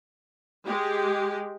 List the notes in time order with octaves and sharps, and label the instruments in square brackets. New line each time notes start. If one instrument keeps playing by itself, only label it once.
[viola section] G#3 G4